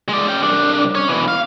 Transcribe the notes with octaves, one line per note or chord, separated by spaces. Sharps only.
G#3 D5
C#4 G5
C2 D4
C#4 C#5
B2 E3
F5